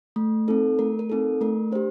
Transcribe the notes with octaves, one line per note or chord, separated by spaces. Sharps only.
A3
C4 D#4 A4
A3 A#4
A#4
C4 D#4 A4
A3 A#4
D4 G4 C5